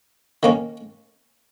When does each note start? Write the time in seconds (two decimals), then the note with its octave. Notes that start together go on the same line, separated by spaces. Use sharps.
0.43 D#3 A#3 C#4